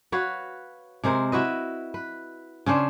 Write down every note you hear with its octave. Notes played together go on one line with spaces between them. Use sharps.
F#4 B4 C#5 F5
C3 G#3 A#4 C5
E4 F#4 B4 D#5
B4
C#3 C#4 D4 C5